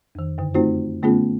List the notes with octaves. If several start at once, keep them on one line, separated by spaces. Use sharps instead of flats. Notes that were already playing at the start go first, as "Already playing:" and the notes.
F2 D#3
F#2 D3
A3 C4 D#4 F4 F#4 C5
D3 A3 B3 C#4 F4 G#4